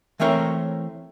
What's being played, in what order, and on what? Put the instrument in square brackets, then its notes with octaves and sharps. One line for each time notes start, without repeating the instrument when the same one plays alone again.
[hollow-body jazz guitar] E3 A3 C4 A#4 C#5